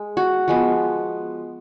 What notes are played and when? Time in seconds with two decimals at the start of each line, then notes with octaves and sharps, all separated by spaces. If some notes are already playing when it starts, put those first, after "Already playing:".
Already playing: G#3
0.17 F#4
0.48 F3 G#3 B3